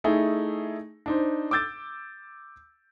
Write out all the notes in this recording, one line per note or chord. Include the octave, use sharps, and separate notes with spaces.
A3 D#4 E4 G#4
D4 D#4 C5
D6 E6 G6 A6